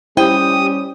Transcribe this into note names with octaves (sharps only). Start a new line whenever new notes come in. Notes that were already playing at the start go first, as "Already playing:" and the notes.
G3 C#4 E4 G4 C5 G5 D#6